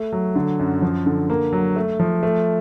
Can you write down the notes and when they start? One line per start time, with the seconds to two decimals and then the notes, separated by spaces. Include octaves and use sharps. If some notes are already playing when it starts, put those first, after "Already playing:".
Already playing: A3
0.12 F#3
0.36 D3
0.59 F#2
0.82 F3
1.06 D3
1.30 A#3
1.53 F#3
1.76 A3
2.00 F3
2.23 A3